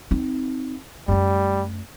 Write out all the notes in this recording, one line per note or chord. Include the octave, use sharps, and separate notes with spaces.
C4 D#4
F#2 G3 A3